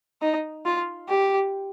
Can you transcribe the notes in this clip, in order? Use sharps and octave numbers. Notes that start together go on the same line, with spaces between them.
D#4
F4
G4